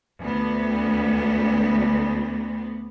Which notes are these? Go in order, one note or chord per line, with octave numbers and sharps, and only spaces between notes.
D2 B3